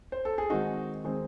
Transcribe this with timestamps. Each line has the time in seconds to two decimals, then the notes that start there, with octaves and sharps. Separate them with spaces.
0.12 C5
0.25 A4
0.38 G#4
0.50 D#3 G#3 C4 D#4 F#4
1.04 D#3 G#3 C4